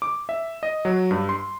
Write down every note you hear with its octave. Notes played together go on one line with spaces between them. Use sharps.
D6
E5
D#5
F#3
G2
C6